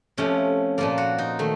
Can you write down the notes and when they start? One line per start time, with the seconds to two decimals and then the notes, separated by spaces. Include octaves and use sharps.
0.18 C3 F3 A3 C#4
0.78 A#2 F3 A#3 F4
0.98 F#4
1.18 D#4
1.39 D#3 A3